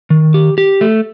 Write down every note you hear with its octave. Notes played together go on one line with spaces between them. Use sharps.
D#3
G4
G4
A3